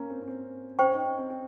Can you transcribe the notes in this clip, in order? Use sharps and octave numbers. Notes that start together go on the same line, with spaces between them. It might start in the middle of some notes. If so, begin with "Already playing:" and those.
Already playing: A#3 C#4 A#4 F5 A#5
C4
C#4
C4
C#4 C5 G5 C#6
D#4
C#4
C4
C4